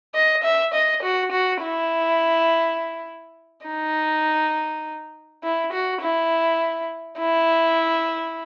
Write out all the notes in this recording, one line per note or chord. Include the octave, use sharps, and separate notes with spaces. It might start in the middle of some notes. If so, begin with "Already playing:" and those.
D#5
E5
D#5
F#4
F#4
E4
D#4
E4
F#4
E4
E4